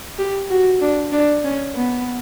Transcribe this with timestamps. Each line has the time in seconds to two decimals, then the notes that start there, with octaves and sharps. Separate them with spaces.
0.18 G4
0.50 F#4
0.81 D4
1.12 D4
1.44 C#4
1.75 B3